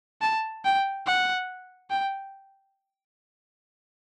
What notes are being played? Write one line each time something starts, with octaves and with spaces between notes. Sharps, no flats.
A5
G5
F#5
G5